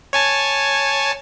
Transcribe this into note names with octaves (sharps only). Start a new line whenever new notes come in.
C#5 G#5 A5